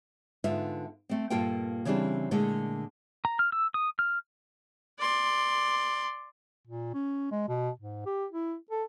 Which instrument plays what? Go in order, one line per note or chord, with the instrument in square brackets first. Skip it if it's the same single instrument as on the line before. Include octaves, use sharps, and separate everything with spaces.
[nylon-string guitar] G#2 D3 B3 F4 E5
A3 C4
G2 A#2 A#3 F4 A4 G5
C#3 E3 G3 C4 D4
A#2 D3 G#3 A3
[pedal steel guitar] A#5
F6
E6
D#6
F6
[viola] D5 C6
[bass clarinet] A#2
C#4
G#3
B2
G#2
G4
E4
A4